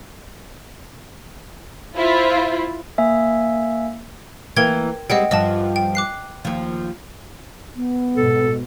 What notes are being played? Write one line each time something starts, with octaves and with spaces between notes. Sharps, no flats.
E4 F4 C5
A#3 E5 G#5
E3 A#3 A#4 G5 G#6
G3 G#3 C4 D#5 F#5 G5
G2 F3 D#5 A5
G5
D6 F#6 C7
D#2 F3
B3
G#2 B2 A4